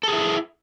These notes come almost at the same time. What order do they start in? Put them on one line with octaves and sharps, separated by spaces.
A4 G#4 E4